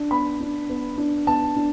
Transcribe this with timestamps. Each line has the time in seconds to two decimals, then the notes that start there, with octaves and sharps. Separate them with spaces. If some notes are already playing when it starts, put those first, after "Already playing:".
Already playing: D4
0.11 B3 B5
0.41 D4
0.69 B3
0.98 D4
1.27 B3 A5
1.56 D4